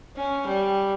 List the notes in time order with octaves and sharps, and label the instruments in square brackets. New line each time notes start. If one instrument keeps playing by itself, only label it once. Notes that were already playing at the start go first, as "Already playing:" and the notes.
[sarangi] C#4
G3